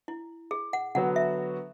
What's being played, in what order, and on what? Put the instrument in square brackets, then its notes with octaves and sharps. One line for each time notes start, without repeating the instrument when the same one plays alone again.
[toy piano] E4
G#4
F#5
[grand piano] D3 F#3 B3 F#4 [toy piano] F#5
[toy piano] E5